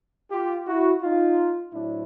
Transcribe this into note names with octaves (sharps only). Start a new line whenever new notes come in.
F4 G4
E4 F#4
D#4 F4
A2 F#3 A3 C4 D4 E4